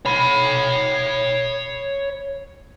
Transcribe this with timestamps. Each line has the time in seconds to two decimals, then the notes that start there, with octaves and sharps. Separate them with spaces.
0.06 C#5 B5